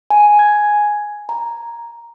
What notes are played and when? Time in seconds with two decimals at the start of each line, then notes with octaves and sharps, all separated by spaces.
0.10 G#5
0.39 G#6
1.29 A#5